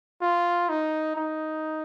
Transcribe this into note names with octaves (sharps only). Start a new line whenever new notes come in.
F4
D#4
D#4